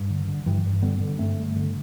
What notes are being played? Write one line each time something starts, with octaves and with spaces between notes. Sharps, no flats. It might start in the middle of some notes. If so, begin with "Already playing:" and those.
Already playing: G2
D3
D3
G2 E3 G3
G2
D3 G3 B3
D3
G2 A3 C4
G2
D3